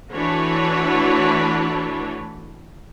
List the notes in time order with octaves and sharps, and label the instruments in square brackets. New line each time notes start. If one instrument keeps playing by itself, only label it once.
[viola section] E3 A3 D4 F#4 B4 C#5